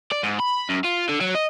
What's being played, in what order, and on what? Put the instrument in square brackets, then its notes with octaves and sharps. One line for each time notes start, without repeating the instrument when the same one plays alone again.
[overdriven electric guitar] D5
G#2
B5
F#2
F4
D3
F#3
D#5